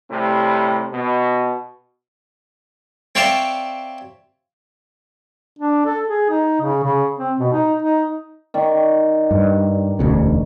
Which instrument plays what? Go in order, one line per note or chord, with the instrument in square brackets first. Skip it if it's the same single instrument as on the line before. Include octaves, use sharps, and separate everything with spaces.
[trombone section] A2 C3 G3
B2
[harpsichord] C4 C#5 D5 E5 F5 A5
[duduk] D4
A4
G#4
D#4
C#3
C#3
C4
B2
D#4
D#4
[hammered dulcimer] D#3 D5 C#6
[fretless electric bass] G2
E1 D2 C#3